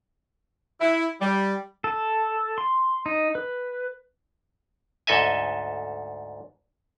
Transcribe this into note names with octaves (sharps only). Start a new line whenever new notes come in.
E4
G3
A4
C6
D#4
B4
D2 G#2 A4 D#5 E5 G#5